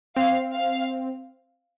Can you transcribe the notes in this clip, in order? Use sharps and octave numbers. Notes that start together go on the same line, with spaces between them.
C4 F5
F5